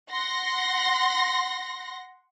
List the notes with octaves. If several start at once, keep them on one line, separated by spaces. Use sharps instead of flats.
F#5 C6 A#6